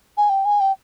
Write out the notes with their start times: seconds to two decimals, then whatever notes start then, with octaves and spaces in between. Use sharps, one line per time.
0.17 G#5
0.30 G5
0.45 G#5
0.60 G5